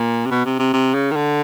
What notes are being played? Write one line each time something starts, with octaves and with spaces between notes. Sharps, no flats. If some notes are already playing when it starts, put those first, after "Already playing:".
Already playing: A#2
C3
B2
C3
C3
C3
C#3
D#3
D3